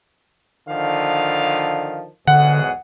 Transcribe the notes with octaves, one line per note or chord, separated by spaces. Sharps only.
D3 D#3 F3 F5
B1 E2 G#2 D3 G#4 F#5